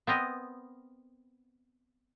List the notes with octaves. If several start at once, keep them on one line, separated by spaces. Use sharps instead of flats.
B3 C4 A#4 D#5